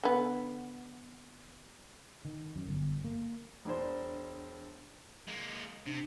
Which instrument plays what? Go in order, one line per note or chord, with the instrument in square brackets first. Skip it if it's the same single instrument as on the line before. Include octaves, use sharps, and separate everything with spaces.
[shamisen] D3 B3
[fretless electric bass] D#3
F#2
G1
A#3
[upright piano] E1 D4 C5
[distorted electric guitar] G#3 A#3
[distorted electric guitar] C3 [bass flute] D4